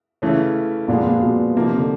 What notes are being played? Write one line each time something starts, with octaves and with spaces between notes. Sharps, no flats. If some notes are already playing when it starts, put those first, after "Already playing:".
C#3 E3 A3 C#4
A#2 F3 G#3 B3 D4
A#2
B2
C3 F3 A#3 D#4
D3